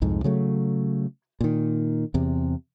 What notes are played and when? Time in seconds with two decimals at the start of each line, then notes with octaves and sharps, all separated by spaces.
0.02 C2 F2 G#2
0.24 C#3 F#3 A3
1.41 A#2 D#3
2.14 E2 C3